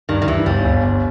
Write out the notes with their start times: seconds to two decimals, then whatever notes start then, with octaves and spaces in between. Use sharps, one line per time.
0.09 G2 D#3
0.22 D#3
0.27 G2 E3
0.46 G1 G3
0.65 G1
0.84 G1